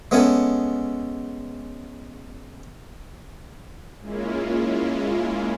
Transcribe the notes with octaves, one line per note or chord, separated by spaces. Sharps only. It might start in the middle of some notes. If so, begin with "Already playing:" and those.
G#3 B3 C#4 E4 G#4 A4
G#3 A#3 C#4 E4 F4